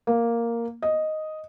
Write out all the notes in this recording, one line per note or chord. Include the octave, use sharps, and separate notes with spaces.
A#3
D#5